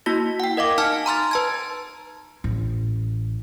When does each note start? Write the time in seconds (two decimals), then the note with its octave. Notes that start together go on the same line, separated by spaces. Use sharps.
0.06 A#3 E4 F#4 A#6
0.40 F#5 G5
0.57 A#4 D#5 F5 D6
0.78 D#4 F#5 G#5 A5 F6
1.06 A#5 C6 F6 A6
1.31 B4 A5 G#6
2.44 A1